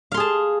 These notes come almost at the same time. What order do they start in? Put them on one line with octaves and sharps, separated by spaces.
F5 C6 G#4 A5